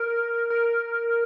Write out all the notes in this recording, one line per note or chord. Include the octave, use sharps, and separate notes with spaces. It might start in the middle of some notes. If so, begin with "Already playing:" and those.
Already playing: A#4
A#4